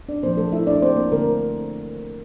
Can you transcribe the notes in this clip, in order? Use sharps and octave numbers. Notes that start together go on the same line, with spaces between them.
D4 D5
A#2 F3 A#3 C4 C5
A3 A4
E4 E5
D4 D5
C4 C5
A#3 A#4
D3 A3 A#3 C4 A#4